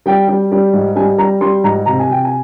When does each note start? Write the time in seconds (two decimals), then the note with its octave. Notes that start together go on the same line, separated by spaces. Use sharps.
0.06 G3 G5
0.28 G3
0.52 G3
0.73 G#2
0.96 G3 G#5
1.18 G3 A#5
1.41 G3 C6
1.64 G#2 A#5
1.86 C3 A#5
1.99 G#5
2.09 C3 G5
2.25 G#5